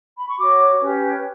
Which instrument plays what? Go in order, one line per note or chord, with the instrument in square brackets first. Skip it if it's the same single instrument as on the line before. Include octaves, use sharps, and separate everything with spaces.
[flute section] B5
C#6
F#4 C#5 D6
C#4 G4 B4